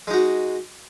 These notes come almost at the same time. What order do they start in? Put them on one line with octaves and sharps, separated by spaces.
G#3 D#4 F#4